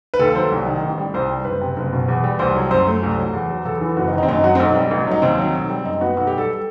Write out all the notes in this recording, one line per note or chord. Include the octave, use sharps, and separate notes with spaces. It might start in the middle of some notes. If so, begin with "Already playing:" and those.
B4
D#2 A4
F#3 C5
C2
D#3
A1
G3
C2 C5
G3
F#1 B4
C3
F#1
B2
E2
G3
C2 C5
F#3
F#2 C5
A3
C2
F#3
E2
F#3
E2 A4
E3
F#1 F#4
D#4
D#3
D#4
C4
F#2 D#4
F#3 F#4
C4
B1 D#4
G3
A1
F#3 D#4
D#2 C4
F#3
B1
G3
F#2 D#4
B3 F#4
B1 F#4
G4
G3
A4